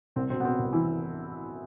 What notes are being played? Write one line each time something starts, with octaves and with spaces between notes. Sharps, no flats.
C2 C4
B2 C4
B3
B2 C4
C2
E3 E4